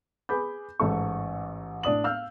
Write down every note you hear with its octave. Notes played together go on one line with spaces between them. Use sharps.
G#4 B4 B5 D6 G6
A1 G#2 A4 C#6
A2 D4 D5 D#6 F#7
F5 E6 F6 G6